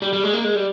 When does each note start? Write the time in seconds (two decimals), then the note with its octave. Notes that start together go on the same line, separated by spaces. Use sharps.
0.02 G3
0.13 G3
0.24 G#3
0.33 A#3
0.44 G#3
0.55 G3